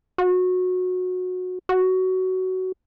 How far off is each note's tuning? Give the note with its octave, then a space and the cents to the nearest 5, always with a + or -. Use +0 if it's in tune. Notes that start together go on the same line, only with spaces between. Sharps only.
F#4 -20
F#4 +15